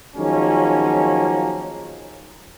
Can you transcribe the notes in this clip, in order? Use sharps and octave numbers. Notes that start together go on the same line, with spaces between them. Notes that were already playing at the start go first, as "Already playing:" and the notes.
D#3 F3 F#3 G#3 A#3 C#4